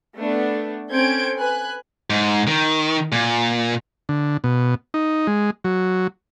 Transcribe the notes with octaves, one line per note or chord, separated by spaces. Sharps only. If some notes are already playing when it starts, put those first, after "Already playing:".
A3 B3 D4
C4 C#4 A4 G6 G#6 D7
B4 G#5 F#6
G#2
D#3
A#2
D3
B2
D#4
G#3
F#3